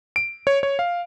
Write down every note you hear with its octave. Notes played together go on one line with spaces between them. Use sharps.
D7
C#5
C#5
F5